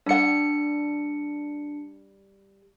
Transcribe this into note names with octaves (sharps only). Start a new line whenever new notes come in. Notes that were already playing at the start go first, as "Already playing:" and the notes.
G3 D4 F#5 C#7